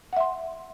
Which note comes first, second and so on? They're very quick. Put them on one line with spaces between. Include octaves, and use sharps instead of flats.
F#5 E5 C6